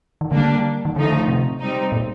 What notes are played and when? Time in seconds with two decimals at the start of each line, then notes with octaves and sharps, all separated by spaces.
0.21 D#3
0.31 D3 G3 A#3 D4
0.85 D#3
0.96 D3 F3 A3 D#4
1.12 D3
1.28 C3
1.60 G3 C4 D#4
1.92 A#2